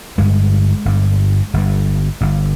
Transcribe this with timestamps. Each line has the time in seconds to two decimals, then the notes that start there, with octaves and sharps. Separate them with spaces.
0.18 G1 G2 G#3
0.85 G1 G2
1.54 G1 G2
2.21 G1 G2